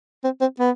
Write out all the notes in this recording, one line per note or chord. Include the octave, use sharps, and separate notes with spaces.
C4
C4
B3